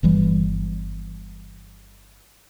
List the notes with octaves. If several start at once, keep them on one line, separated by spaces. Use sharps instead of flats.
G1 E3 G3